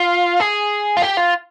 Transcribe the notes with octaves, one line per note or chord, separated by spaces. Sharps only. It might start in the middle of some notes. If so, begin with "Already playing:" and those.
Already playing: F4
G#4
F4
G4
F4